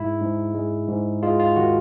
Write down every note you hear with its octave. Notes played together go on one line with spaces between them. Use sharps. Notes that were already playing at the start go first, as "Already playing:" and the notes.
Already playing: G#2 E4
G#2
G#3
G#2
G#3 F4
F4
D#3 F#4